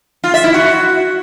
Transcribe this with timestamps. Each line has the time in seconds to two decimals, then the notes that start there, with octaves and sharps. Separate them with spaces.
0.24 F4
0.34 E5
0.44 E4
0.54 F#4